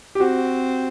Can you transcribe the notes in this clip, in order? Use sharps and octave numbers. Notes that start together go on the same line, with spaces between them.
G4
C4 F#4